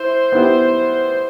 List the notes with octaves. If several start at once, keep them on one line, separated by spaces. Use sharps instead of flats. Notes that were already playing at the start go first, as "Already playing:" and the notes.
Already playing: E4 C5
B3 E4 G4